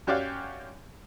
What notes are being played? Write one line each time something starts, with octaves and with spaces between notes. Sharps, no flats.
F#2 F#4 G4 C#5 D5 F5